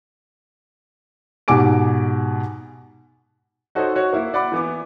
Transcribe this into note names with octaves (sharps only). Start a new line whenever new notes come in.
G#2 B2 G4 G#5 D6 D7
D#4 F#4 A4 C5 C#5 D#5
F#4 C#5
A#3 E4 F#4
D5 F#5 B5 D6
E3 B3 D6